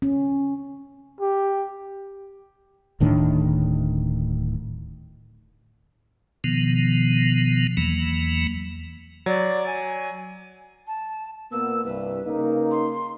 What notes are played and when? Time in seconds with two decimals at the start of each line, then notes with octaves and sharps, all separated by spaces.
0.02 C#4
1.21 G4
3.00 D1 A2 D#3 D4
6.44 B2 D#3 F3 B3
7.77 E2 E3 F#3 A#3
9.26 F#3 D5
9.66 G#5
10.87 A5
11.52 A#2 A#3 B3 E6
11.85 C2 G2 B4
12.25 C#3 A#3 D#4
12.71 C6